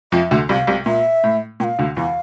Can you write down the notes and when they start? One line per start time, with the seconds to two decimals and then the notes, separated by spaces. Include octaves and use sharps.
0.12 F2 F3 E5
0.31 D2 D3
0.49 C2 C3 F5
0.67 C2 C3
0.86 A#2 E5
1.24 A2
1.60 A#2 G5
1.64 F5
1.79 D2 D3
1.97 E2 E3 F5